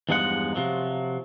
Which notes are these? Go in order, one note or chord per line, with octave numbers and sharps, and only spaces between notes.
E2 G2 F3 G#3 D#4 F#5
C3 F3 F#3